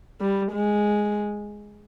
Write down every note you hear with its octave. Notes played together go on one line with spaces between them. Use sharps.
G3
G#3